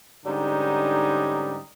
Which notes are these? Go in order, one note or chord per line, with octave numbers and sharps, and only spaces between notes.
G#2 D3 G3 C#4 D#4